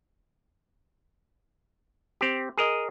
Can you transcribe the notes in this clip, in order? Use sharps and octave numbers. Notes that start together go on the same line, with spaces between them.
C4 G4
G#4 A#4 D#5